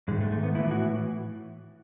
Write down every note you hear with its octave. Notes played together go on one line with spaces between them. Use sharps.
G#2 D#3 G#3
A3
A3
B3
A2 E3 E4
F#4